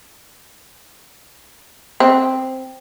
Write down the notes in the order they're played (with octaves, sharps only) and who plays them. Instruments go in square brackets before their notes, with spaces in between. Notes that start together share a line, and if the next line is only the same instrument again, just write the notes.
[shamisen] C4